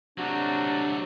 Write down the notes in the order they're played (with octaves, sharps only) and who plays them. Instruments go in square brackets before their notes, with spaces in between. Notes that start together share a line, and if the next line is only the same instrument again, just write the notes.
[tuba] C3 [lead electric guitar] F#3 A3 [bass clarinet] D4 [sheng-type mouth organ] F#4